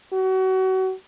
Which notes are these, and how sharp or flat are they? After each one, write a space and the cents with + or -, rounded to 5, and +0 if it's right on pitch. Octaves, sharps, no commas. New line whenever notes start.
F#4 +30